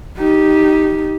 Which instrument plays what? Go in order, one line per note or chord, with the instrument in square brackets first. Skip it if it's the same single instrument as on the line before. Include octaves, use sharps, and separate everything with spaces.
[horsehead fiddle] D#4 G4